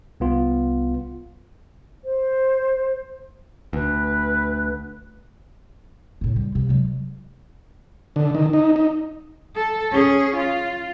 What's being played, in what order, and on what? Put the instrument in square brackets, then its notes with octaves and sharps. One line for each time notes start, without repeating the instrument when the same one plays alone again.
[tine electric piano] C2 B3 F4
[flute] C5
[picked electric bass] D2 [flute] B4
[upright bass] A2 C#3
G3
C3
F#3 G#3
[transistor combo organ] D3
D#3
D#4
D#4
[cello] A4
C#4 G#4
F4